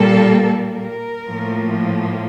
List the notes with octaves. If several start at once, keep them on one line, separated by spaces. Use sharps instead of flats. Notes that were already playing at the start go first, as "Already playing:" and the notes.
Already playing: A#2 G3 A#3 A4
A#4
A2 F3 A#3